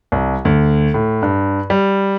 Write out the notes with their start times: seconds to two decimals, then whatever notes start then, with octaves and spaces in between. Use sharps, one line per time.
0.12 C2
0.45 D2
0.94 A2
1.23 G2
1.70 G3